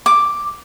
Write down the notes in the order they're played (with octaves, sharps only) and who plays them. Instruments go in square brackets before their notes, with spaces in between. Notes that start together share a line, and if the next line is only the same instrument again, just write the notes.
[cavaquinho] D6